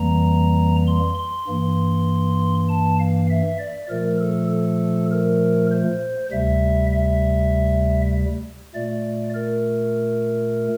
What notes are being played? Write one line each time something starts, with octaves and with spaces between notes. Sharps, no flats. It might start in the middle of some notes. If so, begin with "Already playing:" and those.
Already playing: F2 E3 G3 A#3 A#5
C6
C6
G2 E3 A#3
A5
F5
E5
D5
A#2 F3 A3 A#4
A4
A4
A#4
C5
D2 C3 G3 E5
E5
A#2 A3 D5
A#4